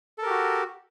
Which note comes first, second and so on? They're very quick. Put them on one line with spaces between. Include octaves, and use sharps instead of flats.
A4 A#4 G4 F#4